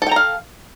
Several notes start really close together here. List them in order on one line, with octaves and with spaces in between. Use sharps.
A4 G5 A#5 F5